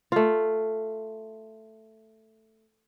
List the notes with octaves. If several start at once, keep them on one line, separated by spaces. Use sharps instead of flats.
A3 F4